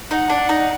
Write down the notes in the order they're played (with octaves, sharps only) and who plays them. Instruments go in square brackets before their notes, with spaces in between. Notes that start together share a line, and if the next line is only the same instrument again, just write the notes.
[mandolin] D#4 [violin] F#5
[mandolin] D4
D#4